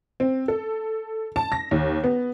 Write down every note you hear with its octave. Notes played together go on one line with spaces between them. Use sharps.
C4
A4
A5
A#6
D#2
B3